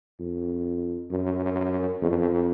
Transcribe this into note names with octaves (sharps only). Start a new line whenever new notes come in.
F2
F#2
F2